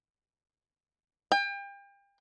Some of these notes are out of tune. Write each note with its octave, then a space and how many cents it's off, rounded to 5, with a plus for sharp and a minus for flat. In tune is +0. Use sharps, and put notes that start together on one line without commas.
G5 +35